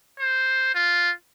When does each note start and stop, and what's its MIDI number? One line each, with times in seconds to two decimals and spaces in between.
0.20 0.71 72
0.75 1.11 65